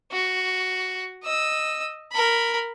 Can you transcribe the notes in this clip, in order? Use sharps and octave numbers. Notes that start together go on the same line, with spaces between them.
F#4
D#5 E6
A#4 B5